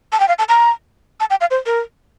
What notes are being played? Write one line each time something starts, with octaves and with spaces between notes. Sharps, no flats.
A5
G5
F5
A5
A#5
A5
G5
F5
C5
A#4